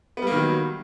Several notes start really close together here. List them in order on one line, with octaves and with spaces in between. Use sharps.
B3 G3 A#3 D#3 F#3